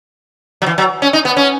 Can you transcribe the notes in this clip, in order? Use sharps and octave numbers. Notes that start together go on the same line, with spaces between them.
F#3
E3
F#3
C#4
D#4
B3
C#4